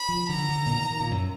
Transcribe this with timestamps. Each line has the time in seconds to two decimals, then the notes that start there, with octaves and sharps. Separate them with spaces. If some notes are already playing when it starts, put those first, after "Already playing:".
Already playing: B5
0.09 F3
0.29 D3 A#5
0.49 D3
0.66 A#2
0.70 B2
0.80 D#3
0.91 D#3
1.00 A#2
1.11 F#2